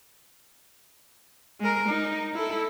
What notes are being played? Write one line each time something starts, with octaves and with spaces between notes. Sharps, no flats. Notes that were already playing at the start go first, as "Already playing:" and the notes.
G#3 A#4
D#4
E4 A4